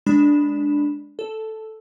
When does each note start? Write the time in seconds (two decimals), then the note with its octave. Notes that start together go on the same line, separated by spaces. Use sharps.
0.06 G#3 D4 B5 E7
1.19 A4